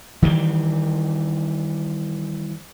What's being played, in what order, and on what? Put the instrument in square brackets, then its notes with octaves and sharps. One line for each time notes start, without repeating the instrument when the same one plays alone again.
[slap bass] D#3 E3 G3